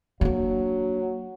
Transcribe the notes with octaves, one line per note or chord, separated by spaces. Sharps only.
F#3 A#3 D4